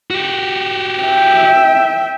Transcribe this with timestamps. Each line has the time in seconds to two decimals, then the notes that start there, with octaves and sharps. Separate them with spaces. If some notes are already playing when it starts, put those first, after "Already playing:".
0.11 F#4 G4
1.01 E5 G5